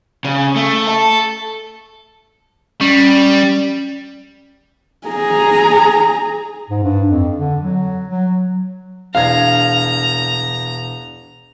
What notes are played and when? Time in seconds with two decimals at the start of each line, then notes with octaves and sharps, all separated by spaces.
0.25 C#3
0.56 A3
0.87 A4
2.81 G3 C#4
5.07 G#4 A#5
6.70 G#2
6.83 G2
7.09 F2
7.38 D3
7.61 F#3
8.07 F#3
9.15 E1 D4 F5 A#5 G#6